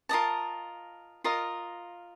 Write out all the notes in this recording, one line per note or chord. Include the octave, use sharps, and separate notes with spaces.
F4 A#4 D#5 A5
F4 A#4 D#5